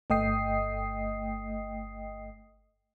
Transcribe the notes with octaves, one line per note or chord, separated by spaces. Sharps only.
G1 A3 D#5 G5 D#6 C7